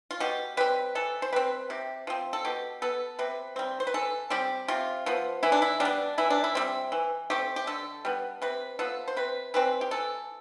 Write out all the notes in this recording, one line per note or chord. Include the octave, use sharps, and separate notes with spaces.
F4
B2 G4
G3 C4 B4
E3 A4
C5
G3 C4 B4
C3 G4
F3 C4
A4
B2 G4
B3 A4
C3 B4
G3 C4
C5
B4
E3 A4
G3 C4 G4
C3 F4
F3 B3
E3 E4
D4
E4
G3 D4
B3
E3 E4
D4
E4
G3 C4
E3
A3 C4 G4
G4
D3 A4
G3 B3
C3 B4
F3 B3 A4
C5
C3 B4
E3 G3 C4 B4
G4
E3 A4